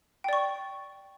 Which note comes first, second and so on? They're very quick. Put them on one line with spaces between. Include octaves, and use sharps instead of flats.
G5 D5 C#6